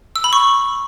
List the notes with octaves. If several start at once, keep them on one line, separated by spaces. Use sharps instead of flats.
E6
B5
C#6